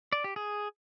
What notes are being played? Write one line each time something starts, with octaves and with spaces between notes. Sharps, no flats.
D5
G4
G#4